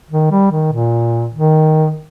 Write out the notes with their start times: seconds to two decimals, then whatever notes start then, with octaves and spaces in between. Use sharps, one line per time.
0.11 D#3
0.31 G3
0.51 D#3
0.73 A#2
1.34 D#3